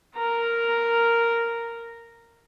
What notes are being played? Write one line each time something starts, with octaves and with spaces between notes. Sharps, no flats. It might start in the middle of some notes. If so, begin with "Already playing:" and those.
A#4 A#5